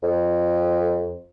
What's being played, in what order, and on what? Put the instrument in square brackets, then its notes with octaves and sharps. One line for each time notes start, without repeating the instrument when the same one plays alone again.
[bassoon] F2